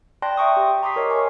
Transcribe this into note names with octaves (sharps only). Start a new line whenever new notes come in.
D5 G5 A5 C6 F#6 A#6
E5 G5 C#6 D#6
G4
A#5 C6 D6 D#6 B6 C7
A#4 C#5 D#5
G#5 C#6